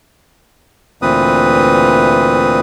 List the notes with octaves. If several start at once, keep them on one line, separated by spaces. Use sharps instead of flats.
D2 A#2 E3 C4 B4 D#6